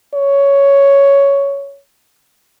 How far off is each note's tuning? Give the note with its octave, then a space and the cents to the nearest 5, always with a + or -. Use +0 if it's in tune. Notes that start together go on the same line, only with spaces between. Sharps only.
C#5 +10